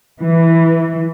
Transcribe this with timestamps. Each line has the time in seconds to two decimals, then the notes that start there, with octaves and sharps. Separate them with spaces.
0.20 E3